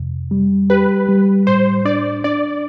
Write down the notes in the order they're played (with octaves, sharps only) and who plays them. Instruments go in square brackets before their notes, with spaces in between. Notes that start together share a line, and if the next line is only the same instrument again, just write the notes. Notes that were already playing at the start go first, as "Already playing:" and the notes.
Already playing: [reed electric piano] F2 C3
G3
[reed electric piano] G4 [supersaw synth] B4
[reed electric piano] G3
[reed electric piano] A2 [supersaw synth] C5
[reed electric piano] D4 [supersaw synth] D5
[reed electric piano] D4 [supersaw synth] D5